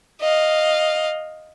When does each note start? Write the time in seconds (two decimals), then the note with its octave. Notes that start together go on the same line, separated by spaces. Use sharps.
0.20 D#5 F5